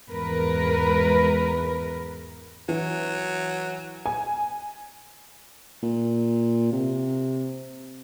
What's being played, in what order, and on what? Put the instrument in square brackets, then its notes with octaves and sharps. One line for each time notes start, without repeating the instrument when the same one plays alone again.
[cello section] E2 G#2 A#4 B4
[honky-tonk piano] E3 [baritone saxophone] F#3
[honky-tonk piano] G#5
[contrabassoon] A#2
C3